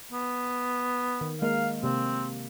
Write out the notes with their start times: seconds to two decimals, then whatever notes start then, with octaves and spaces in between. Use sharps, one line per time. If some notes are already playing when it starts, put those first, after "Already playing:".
0.13 B3
1.21 D#3
1.42 G#3 A#3 A#4 F5
1.83 C3 A#3 C4